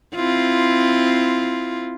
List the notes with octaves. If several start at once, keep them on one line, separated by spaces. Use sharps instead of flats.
C4 E4 F4